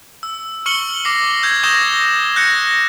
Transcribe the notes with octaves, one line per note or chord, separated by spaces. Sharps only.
E6
C#6 F6 C#7 F#7 G7
D6 A#6 C7
E6 G6 G#6
C#6 D#6 G6 A#6 E7 G7
F#6 G6 A#6 C#7